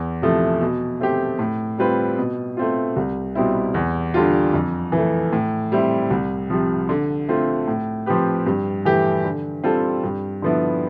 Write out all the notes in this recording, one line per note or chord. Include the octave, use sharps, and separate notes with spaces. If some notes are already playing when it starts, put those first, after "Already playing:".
Already playing: E2
C3 F3 A3 E4
B2
A3 C4 G4
A2
G3 C4 F4 B4
B2
A3 C4 F4
C2
B2 G3 C4 E4
E2
D3 G3 D4 F4
F2
E3
A3
A2
G3 C4 E4
C2
C3 F3
D3
A3 C4 F4
A2
F3 C4 G4 B4
G2
E3 A3 E4 G4
D3
G3 C4 F4 A4
G2
D3 F3 B3 E4